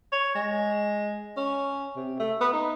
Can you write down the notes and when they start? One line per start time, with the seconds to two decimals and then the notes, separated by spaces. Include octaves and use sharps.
0.12 C#5
0.35 G#3
1.37 C#4
1.96 C3
2.19 A3
2.41 B3
2.53 D#4